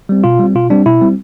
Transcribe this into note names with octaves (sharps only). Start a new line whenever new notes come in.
G3 C4
B2 F4
G3 C4
B2 F4
G3 C4 D4
B2 E4
G3 C4